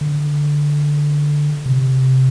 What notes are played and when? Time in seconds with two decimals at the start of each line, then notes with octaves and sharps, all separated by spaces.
0.01 D3
1.66 C3